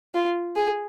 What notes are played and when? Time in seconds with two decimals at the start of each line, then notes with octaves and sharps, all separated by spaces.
0.14 F4
0.56 G#4